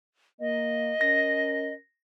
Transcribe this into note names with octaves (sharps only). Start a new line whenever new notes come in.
A#3 D#5
C#4 A#4 A#6